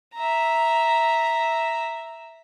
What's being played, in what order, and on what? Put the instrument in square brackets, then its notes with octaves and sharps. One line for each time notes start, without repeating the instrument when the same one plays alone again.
[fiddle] E5 A#5